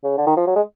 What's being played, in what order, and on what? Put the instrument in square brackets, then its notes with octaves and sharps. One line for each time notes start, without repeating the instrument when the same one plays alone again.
[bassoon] C#3
D3
D#3
F3
F#3
G#3